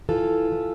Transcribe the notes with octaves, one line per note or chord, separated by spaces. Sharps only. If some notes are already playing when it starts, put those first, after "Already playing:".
E3 F4 A4
E3